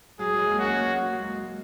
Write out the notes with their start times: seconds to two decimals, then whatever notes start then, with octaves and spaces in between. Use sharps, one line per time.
0.19 F#3 G#4
0.33 F#3
0.39 G#3
0.51 A#3
0.59 C#4 F#4
0.78 A#3
0.98 A#3
1.13 G#3
1.17 F#3
1.37 G#3